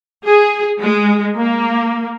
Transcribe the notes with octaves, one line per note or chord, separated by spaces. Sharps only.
G#4
G#3
A#3